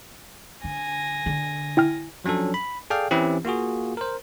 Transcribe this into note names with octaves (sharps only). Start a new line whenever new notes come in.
D3 G#5 A#6
D3
E4 G5 F6
F3 F#3 C#4 D4 A4
B5
G#4 A4 D5 F5 G5 F6
E3 C4 C#4 E4 G4
A#3 F4 F#4 G#4
A#4 C5